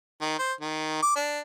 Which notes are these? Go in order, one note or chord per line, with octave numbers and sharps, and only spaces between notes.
D#3
C5
D#3
D6
D4